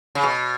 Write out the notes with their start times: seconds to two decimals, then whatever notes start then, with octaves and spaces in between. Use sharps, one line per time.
0.15 C#3
0.23 B2